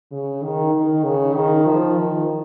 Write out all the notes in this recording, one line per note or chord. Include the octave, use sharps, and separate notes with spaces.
C#3
D#3
D#3
C#3
D#3
F3
D#3